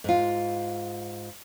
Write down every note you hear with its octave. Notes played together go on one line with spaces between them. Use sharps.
G#2 F4